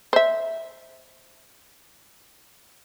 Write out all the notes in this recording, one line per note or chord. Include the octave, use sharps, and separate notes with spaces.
C5 E5